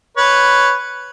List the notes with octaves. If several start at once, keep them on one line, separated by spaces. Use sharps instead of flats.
B4 C#5